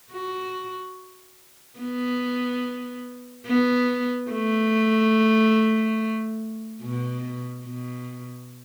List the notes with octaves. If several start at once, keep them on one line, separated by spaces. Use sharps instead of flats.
F#4
B3
B3
A3
B2
B2